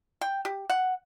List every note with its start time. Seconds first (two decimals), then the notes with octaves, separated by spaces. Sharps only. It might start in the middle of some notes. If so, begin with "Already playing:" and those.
0.21 G5
0.45 G4
0.70 F#5